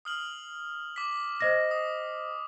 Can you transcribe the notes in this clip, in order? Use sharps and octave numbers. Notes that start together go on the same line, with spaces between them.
D#6 F6 F#7
D6 B6
C5 D#5 A#6
D#6